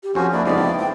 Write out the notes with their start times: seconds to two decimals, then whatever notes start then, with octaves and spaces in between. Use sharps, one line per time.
0.03 G4
0.15 F2 F3 C#4 F#4 C5 G#5
0.32 A#3 D4 E4 D5
0.45 F2 C#3 F3 G#3 B3 D#4 D5
0.58 E4 G5
0.78 G#3 G5